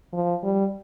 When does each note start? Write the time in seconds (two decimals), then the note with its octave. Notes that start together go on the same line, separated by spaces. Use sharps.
0.13 F3
0.43 G3